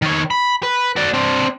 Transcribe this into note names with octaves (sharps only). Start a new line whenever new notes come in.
D#3 C#5
B5
B4
F#4 D5
C4 D4